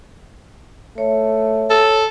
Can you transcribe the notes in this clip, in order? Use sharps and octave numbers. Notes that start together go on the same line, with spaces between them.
A3 C#5
A4